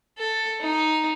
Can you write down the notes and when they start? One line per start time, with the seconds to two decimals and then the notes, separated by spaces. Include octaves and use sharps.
0.18 A4
0.61 D#4